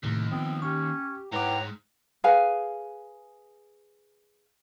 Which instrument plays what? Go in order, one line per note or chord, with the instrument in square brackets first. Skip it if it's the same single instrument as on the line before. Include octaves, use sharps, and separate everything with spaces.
[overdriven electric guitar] D#2 [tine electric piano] A2 C3 A3
[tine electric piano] F3 B3 [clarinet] C4 [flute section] D#6
[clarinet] C#4 [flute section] G4 [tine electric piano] C#6
[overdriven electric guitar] G#2 [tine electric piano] E4 B4 D6 [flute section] C#5 F#5 G5 [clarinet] A#5
[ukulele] G#4 B4 F5 G#5